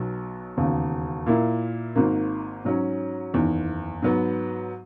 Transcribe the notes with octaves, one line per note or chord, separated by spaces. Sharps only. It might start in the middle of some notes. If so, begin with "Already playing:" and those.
Already playing: B1 B2 F#3
E1 D#2 C#3
A#2 A#3 E4
G#1 G#2 D#3 A#3
G#2 F#3 C#4
F#1 E2 D#3
G#2 F#3 B3